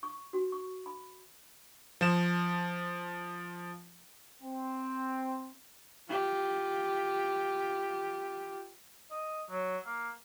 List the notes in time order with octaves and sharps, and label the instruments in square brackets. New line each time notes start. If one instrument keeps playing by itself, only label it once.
[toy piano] C#6
F#4
C#6
B5
[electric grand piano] F3 E7
[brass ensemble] C4
[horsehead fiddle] F4 G4
[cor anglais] D#5
F#3
A#3